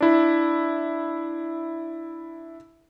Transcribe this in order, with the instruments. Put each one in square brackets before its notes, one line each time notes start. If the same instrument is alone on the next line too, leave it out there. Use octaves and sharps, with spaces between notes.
[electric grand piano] D4 E4